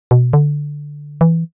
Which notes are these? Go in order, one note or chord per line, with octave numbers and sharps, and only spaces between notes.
B2
D3
E3